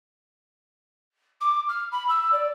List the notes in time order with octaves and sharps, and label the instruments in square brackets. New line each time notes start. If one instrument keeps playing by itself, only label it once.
[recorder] D6
F6
B5
E6
D5